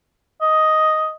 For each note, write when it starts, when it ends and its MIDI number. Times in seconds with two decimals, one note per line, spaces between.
0.41 1.14 75